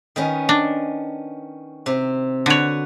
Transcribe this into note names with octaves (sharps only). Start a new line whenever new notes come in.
D#3 B3 C#4
D4
C3
D3 F#4 B4 C#5